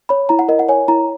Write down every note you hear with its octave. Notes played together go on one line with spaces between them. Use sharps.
C#5 B5
E4 A#5
F#5
A#4 D#5
F#5
C#5 G#5
E4 A#5